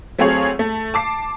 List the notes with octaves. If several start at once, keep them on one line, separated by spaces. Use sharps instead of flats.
F#3 A3 C4 F4 G#4 C#5
A3
A5 D6 C7